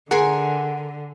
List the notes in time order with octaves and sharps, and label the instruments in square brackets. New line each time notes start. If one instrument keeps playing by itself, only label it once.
[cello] D3 [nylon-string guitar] G#4 [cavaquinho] A#4 G#5 C6 [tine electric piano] F#5